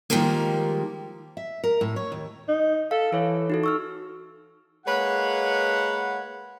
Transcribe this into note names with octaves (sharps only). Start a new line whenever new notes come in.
D#3 F3 G3 G#3 A#3
E5
A#4
A2
C#5
D#2
D#4
A4 F5
E3 A4 C#5
D#4 F#4 A4
C#6 E6 F6
G#3 A#3 B4 C#5 F#5